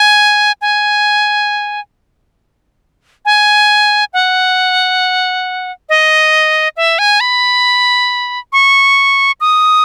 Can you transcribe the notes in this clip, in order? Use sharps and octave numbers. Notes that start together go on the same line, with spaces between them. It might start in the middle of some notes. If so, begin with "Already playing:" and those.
Already playing: G#5
G#5
G#5
F#5
D#5
E5
G#5
B5
C#6
D#6